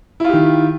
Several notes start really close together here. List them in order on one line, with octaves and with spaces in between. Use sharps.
E4 F4 G4 D#3